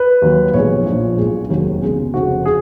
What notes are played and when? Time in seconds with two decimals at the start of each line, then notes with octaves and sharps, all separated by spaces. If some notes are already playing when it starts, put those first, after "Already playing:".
Already playing: B4
0.22 D#2 D#3 F#3
0.54 B1 A#2 F3 G#3 C#5
0.86 A#1 A#2 F3 G#3
1.18 B1 B2 G#3
1.50 F1 D#2 D#3 F#3
1.82 C#2 B2 G#3
2.14 F1 F2 C#3 F#4
2.45 G#4